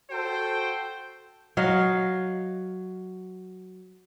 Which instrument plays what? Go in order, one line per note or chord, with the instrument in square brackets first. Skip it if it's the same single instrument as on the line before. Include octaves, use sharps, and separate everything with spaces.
[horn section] F#4 A4 C5 G5
[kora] F#3 D#5 F5